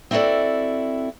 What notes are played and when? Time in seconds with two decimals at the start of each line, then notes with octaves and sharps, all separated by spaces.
0.11 C4 E4 F#4 G#4 A4 D5